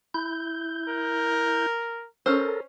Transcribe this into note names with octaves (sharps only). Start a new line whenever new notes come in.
E4 G6
A#4
C#4 A4 A#4 C5